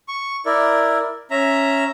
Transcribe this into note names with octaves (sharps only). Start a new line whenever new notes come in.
C#6
E4 A#4 D5
C#4 E5 A#5